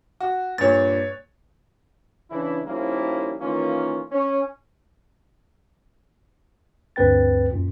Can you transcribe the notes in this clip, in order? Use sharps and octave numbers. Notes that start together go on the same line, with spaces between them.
F#4
G2 A#2 C#5 A6
C#3 E3 D4 E4
D#3 F3 G3 A#3 C#4 E4
D#3 E3 A#3 C#4 F4
C#4
D2 G2 C4 B4 G5 A6
F#2 A#2